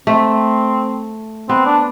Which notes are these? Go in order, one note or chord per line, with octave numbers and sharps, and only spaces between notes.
A3 C4
B3 C4
D4